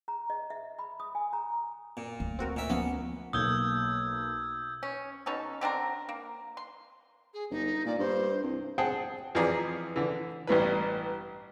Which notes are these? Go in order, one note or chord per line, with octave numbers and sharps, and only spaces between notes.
A#5
D#5
E5
B5
D#6
G#5
A#5
A#2
D2
C4 F#4 A#4
A#2 E5
F3 A#3 B3 C#4
B1 A#3 D#6 E6 G6 G#6 G7
C#4
B2 C#4 D#4 A4
D3 C4 D4 A#4
A#3
C6
G#4
G1 D#4
A#2 D5
G2 C5
C2
C4 G#4 F#5 G5 A5
F2 E3 F4 G#4 D5 A#5
D3 E3
A1 G2 E3 B4